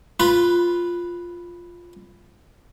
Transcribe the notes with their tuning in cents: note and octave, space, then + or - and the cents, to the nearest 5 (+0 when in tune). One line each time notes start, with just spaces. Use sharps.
F4 +0 B4 +0 B5 -20